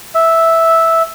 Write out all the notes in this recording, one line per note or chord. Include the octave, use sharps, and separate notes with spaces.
E5